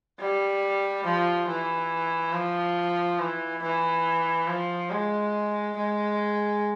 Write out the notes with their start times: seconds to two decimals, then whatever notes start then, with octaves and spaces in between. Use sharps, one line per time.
0.19 G3
1.05 F3
1.48 E3
2.33 F3
3.19 E3
3.62 E3
4.47 F3
4.91 G#3
5.77 G#3